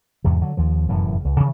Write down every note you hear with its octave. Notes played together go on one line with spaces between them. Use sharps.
E2 G#2 C3
D3 F#3
D#2 F3
F1 F#2 A2 E3
C#2
G2 C3 D#3 E3